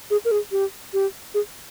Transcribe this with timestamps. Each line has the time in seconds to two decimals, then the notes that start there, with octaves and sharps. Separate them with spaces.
0.11 G#4
0.25 A#4
0.31 G#4
0.52 G4
0.93 G4
1.34 G#4